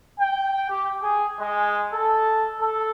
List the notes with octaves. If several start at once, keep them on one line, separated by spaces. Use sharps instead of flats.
G5
G4
G#4
G#3
A4
A4